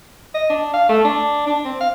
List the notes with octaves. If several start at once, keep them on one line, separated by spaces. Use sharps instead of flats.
D#5
D4
F5
A3
D4
D4
C4
F5